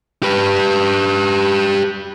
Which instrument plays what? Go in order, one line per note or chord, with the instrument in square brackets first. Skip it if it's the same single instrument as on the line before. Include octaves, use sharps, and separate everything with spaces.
[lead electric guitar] G4 B4